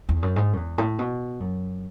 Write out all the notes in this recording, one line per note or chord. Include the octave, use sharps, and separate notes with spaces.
E2
F#2
G#2
F#2
E2
A2
B2
F#2